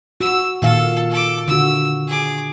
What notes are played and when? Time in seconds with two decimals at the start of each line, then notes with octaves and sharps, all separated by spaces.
0.20 F#4 E6
0.62 A#2 D#3 A4 F5
1.11 A4 D6
1.48 D3 F#4 E6
2.08 G#4 D6